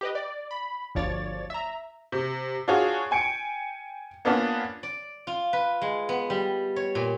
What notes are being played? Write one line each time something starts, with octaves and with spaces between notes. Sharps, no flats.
G4 B4 D#5
D5
B5
G1 D2 F3 C#5 D5 A6
E5 A#5
C3
D4 F4 F#4 G#4 C#5
G5 G#5 C#7 D7
A#3 B3 C#4 D4 F4
D5
F4
B4
G#3
B3
G3
C#5
A#2